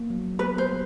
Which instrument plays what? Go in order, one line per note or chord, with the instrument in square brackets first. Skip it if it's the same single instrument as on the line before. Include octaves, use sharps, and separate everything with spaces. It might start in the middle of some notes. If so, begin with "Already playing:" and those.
Already playing: [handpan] A#3
F#3
[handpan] B3 [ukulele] B4
[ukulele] C5
[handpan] G3